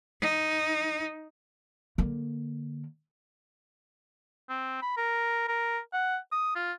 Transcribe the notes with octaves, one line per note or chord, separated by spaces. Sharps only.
D#4
D3 A#3
C4
B5
A#4
A#4
F#5
D#6
F4